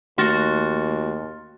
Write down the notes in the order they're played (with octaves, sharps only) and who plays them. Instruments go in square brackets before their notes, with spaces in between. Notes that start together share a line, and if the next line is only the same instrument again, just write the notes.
[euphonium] D#2 [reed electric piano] A3 [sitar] F#4 [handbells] C6 F6 A6